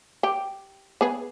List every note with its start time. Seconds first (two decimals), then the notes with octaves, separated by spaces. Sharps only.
0.23 G4
1.01 B3 G#4 B4